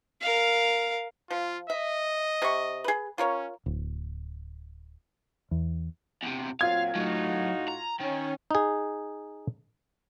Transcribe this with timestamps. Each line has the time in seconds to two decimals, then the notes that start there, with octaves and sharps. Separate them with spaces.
0.22 A#4 F5
1.30 F3 F4
1.70 D#5 E5
2.42 C3 C#6
2.84 G#4 B4
3.18 C#4 F4 A#4 C#5
3.66 D1
5.51 E2
6.23 E2 C3
6.61 A#2 F#3 C4 F4 F5 G#6
6.95 A2 F#3 A3 D#4 F#4
7.68 A#5
8.01 D#3 C#4
8.51 D#4 G#4